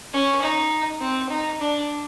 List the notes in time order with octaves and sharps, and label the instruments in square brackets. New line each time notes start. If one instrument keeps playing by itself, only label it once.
[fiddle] C#4
D#4
C4
D#4
D4